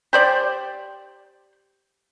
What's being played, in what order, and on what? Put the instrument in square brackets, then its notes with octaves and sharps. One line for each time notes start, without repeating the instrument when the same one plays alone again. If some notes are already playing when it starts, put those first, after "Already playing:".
[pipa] G4 C5 D5